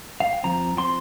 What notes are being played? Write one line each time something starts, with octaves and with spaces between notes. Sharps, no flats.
F5
G5
F2 F3 C4 A#5
F3 C4 C6